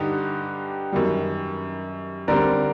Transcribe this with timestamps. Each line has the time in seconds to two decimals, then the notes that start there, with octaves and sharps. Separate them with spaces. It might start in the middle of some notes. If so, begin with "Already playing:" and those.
Already playing: G2 D3 D#4 G4
0.93 F#2 D#3 G3
2.28 D3 G3 C4 A#4 D5